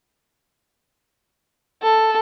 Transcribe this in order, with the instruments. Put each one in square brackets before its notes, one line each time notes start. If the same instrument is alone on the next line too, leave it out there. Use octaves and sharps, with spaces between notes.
[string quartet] A4